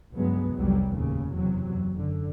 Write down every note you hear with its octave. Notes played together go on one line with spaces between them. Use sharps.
C#2 G2 F#3 G#3 B3
F1 C2 F#3 G3
D#2 A2 C#3
F#1 E2 C3 F#3
F#1 D3